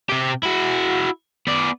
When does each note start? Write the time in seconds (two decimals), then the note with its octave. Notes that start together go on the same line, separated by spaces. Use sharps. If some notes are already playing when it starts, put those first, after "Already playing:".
0.10 C3 G4
0.43 E4 F#4
1.47 B3 D5